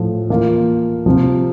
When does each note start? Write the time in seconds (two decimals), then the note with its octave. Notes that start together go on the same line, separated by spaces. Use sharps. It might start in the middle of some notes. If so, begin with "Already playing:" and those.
Already playing: A2 F3 A3
0.30 E3 A#3 F4
1.06 C3 F3 C4 F4